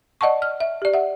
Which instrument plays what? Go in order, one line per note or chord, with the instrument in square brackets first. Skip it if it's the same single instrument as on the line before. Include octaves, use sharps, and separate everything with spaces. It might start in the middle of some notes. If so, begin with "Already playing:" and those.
[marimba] D5 D#5 F#5 A5 C#6
F6
E5
G4 D5
E5 F#5